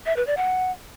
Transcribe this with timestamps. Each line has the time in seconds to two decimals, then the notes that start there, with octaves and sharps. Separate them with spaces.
0.06 E5
0.16 B4
0.27 D5
0.37 F#5